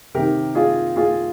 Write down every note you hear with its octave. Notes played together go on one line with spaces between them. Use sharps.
C3 D#3 G4 A#4
F4 G#4
F4 G#4